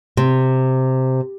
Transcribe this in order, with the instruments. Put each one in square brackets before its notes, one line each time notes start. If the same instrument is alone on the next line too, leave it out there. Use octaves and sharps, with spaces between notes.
[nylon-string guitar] C3